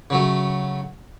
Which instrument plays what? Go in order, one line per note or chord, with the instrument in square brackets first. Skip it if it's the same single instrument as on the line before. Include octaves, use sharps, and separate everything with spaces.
[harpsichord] C#3 F#3 A3